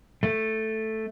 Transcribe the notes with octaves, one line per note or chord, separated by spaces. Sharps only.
A3